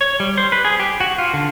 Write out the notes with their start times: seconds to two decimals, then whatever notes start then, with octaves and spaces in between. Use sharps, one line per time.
0.01 C#5
0.20 G3
0.38 C5
0.52 B4
0.65 G#4
0.80 G4
1.00 F#4
1.18 F4
1.34 D3